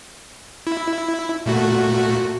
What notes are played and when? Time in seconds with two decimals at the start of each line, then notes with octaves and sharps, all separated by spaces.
0.67 E4
1.46 A#2 A3 F#4